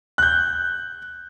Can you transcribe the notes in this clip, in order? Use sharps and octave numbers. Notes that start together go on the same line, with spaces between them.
F#6 G6